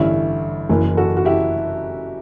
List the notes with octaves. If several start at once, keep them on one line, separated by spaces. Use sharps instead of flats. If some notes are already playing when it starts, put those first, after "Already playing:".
Already playing: A1 G2 D3 C#4 E4
F#1 F#2 E3
F#4 A4
F#4
E4 G4